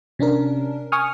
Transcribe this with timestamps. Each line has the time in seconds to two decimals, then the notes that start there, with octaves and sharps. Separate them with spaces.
0.19 C3 C#4 D4 A#4
0.92 G#5 C#6 D#6 F6